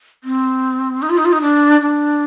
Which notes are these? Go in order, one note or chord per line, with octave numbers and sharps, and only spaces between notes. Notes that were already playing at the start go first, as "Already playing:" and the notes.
C4
D#4
F4
D#4
F4
D#4
D4
D4